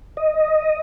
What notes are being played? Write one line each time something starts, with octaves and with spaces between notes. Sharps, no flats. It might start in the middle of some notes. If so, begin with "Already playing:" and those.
D#5